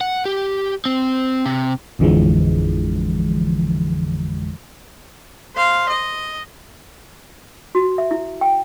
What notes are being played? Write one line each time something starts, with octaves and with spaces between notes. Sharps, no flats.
F#5
G4
C4
C3
A1 F2 D3 E3 F3 G#3
C5 F5
D#5
F#4
E5
E4
G5